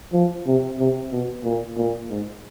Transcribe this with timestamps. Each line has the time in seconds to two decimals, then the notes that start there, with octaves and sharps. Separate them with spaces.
0.13 F3
0.46 C3
0.79 C3
1.12 B2
1.44 A#2
1.77 A#2
2.10 G#2